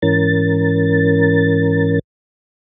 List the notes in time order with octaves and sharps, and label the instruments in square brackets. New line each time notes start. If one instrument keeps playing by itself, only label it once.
[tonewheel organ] G#2 E3 C#4 A#4 A6